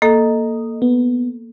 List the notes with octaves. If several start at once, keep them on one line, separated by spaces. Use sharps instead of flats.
A#3 A4 D#5
B3